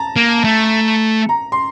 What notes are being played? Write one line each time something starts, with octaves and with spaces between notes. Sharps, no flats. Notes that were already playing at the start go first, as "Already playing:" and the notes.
Already playing: A5 A#5
A#3
A3
A#5
C6